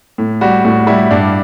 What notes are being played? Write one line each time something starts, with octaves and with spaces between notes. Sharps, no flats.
A2
G3 F#4
A2 F#4
G3 E4
G2 D4